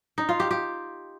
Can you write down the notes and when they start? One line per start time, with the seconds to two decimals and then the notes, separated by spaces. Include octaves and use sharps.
0.18 D#4
0.29 F4
0.40 G4
0.51 G4